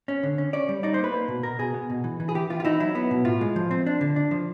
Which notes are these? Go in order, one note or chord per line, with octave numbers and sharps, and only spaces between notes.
C#4
D3
C#4
C#4 D5
G3
D#4 D5
C5
A#3
B4
A#3
B2
B2 A#4
B2 G#4
B3
B2
E3
E3
G#4
E3 G4
E3 F4
F4
D#4 E4
F#3 E4
B3
B2
A2 F4
G#3
F3
C4
D4
D3
D4
F3